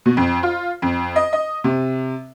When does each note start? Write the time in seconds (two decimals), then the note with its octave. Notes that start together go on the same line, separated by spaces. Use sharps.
0.06 B2
0.17 F2
0.43 F4
0.82 F2
1.16 D#5
1.33 D#5
1.64 C3